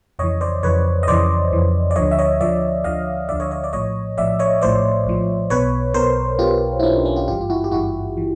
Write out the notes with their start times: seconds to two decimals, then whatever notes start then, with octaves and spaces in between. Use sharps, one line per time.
0.19 F2 C#3 E3 C#5 D#5
0.41 C5 D5
0.63 F2 C#3 E3 B4 C#5
1.03 D#5
1.08 F2 C#3 E3 C5 D5
1.52 F2 C#3 E3
1.91 D5
1.96 D2 D3 F3 C#5 D#5
2.11 E5
2.19 C#5 D#5
2.41 D2 D3 F3 D5 E5
2.84 D2 D3 F3 D#5 F5
3.29 D2 D3 F3 D5 E5
3.40 C#5 D#5
3.51 C#5 D#5
3.64 D5
3.73 A#1 A2 F3 C#5 D#5
4.18 A#1 A2 F3 D5 E5
4.39 C#5 D#5
4.62 A#1 A2 F3 C5 D5
5.06 A#1 A2 F3
5.50 B1 B2 B4 C#5
5.94 B1 B2 A#4 C5
6.39 B1 B2 F4 G4
6.80 E4
6.83 B1 B2 C#4 D#4
6.94 D4
7.05 C#4
7.16 F4 G4
7.28 G#1 G2 E3 F4 G4
7.41 F4
7.50 E4 F#4
7.64 G4
7.72 G#1 G2 E3 E4 F#4
8.17 E3